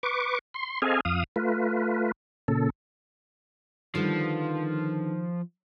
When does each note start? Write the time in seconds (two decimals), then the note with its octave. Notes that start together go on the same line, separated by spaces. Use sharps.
0.03 B4 C#6 D6
0.54 C6
0.82 C4 G#4 A4 D#5 F5 G#5
1.05 F2 F5 D#6
1.36 A3 F4 B4
2.48 A#2 C#3 A4
3.95 D3 D#3 F3 G3 B4